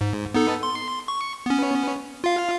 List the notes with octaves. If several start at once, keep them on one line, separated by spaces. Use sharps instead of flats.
G#2
B3 D#4 A4
C6
C#6
B3 C#4
F4 F5